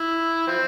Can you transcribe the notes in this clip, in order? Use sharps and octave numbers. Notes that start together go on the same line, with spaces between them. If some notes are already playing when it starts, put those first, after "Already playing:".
Already playing: E4
F3 C4